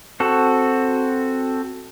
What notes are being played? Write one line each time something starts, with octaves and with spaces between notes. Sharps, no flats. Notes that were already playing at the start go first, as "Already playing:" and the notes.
C4 F#4 A4